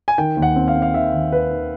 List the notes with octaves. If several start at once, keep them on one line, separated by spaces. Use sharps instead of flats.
G#5
D#3 G5
D#2
F#5
C4
F5
C4
F5
D#3 E5
D#2
D#3 B4
D#3